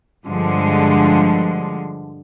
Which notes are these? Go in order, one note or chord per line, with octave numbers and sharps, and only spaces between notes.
G2 D3 F3 G#3